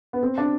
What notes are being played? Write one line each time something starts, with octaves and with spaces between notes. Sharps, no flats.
B3
C4
D4